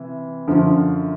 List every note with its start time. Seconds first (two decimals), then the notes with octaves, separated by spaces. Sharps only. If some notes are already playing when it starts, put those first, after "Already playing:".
Already playing: C3 E3
0.48 F#2 D3 F3